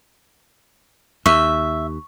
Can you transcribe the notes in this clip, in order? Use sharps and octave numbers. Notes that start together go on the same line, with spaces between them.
D#2 E5 C#6